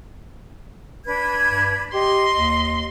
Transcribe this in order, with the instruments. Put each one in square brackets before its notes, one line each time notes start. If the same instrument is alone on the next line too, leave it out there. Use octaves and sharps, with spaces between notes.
[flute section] D4 B4 G#6
[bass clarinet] G2
[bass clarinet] G4 [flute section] D#5 [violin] C6
[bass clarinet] D#2